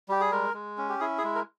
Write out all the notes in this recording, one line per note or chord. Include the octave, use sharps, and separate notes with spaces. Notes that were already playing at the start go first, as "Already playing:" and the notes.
G3 G4
G#4
G#3 A#4
G#3
C#4
G4
E4 G#4
G#4
G#3
A#4